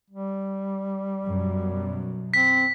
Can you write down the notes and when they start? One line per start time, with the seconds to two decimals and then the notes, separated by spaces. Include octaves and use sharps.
0.11 G3
1.24 F#2 B2
2.34 C4 B6